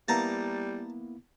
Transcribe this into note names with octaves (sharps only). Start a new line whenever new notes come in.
G3 A#3 B3 E4 A5 A#5